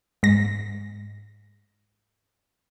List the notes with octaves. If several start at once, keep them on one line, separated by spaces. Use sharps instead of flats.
G#2 A#6